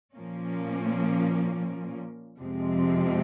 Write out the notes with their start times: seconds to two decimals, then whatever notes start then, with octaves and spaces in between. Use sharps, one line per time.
0.15 A#2 F3 A#3 C#4
2.39 F2 C3 F3 G#3 C4